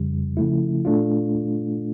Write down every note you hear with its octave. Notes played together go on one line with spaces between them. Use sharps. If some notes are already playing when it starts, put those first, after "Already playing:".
Already playing: F2 C#3 G3
C#3 F3 A3 E4
A#2 A3 D4 F4